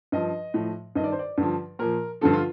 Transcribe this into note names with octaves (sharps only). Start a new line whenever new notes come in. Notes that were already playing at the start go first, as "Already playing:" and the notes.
G2 F3 D#5
A2 F3
G2 D#3 D5 D#5
C5
D5
G2 D3 F3
A#2 F3 A#4
G2 D3 F3 A4
F4